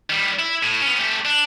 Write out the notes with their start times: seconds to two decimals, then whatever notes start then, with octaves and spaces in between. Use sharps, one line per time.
0.10 D#3 G3
0.39 E4
0.63 A2
0.82 B3 C#4
1.00 A3 G4
1.25 D4